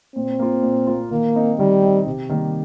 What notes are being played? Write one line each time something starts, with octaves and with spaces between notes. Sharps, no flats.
A#2 C4
A#3 F4
A#2
A#3 F4
D#3 A#3
C4 D#4
D#3 G3
C4 D#4
C3
D#3 G3 A#3